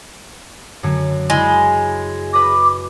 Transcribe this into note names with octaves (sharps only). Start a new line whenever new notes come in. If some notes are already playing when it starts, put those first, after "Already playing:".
F#2 D3 G#3
C#3 G#3 E4
B4 D#5 D6 A#6